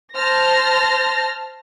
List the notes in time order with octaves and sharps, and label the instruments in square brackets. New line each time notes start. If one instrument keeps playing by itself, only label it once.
[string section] C5 A5 F6 A#6